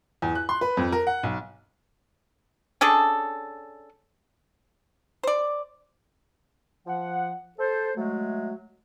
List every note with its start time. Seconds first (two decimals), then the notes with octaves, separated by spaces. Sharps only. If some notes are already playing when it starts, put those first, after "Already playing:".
0.22 E2
0.35 F#6
0.49 C6
0.61 B4
0.77 F2
0.92 A#4
1.07 F#5
1.23 B1
2.81 C#4 D4 G#4 A4
5.23 C5 D5
6.87 F3 F#5
7.58 A4 C5
7.96 F#3 G#3 A3